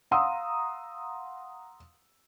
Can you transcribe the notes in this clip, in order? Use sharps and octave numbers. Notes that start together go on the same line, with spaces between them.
F5 F#5 A#5 C6 D#6 E6